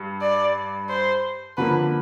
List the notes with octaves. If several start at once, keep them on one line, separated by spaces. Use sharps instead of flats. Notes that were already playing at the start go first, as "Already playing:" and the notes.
Already playing: G2
D5
C5
D3 F3 A#3 B4